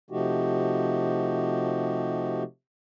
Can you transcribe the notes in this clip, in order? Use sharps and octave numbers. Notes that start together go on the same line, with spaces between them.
C3 F3 A3 D#4 F#4 G4